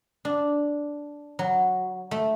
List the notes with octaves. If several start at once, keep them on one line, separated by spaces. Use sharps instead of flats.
D4
F#3
A3